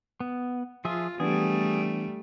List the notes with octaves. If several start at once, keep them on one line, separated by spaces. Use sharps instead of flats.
B3
F3 F4 G#4 E5
E3 G3 A3 B3 D4 G#4